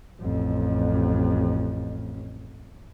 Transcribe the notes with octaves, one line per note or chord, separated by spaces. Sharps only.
A1 F2